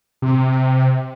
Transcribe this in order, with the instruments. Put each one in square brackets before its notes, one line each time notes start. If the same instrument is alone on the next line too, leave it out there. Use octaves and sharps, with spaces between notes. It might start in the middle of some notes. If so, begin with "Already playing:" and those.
[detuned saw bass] C3